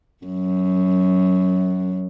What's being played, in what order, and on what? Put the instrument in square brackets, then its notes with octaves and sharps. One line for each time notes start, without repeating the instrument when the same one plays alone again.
[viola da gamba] F#2